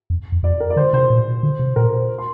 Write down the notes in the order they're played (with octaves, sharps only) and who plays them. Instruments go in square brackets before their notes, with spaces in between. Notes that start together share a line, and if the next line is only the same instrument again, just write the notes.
[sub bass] F2
F2
[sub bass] F2 [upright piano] D5
[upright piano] A#4
D5
[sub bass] D3 [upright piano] C5
[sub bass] C3 [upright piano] C5
[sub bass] A#2
D3
C3
[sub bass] A#2 [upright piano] A#4
[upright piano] C5
C6